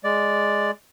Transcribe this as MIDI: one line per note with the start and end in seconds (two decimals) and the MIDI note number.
0.04 0.71 56
0.04 0.71 74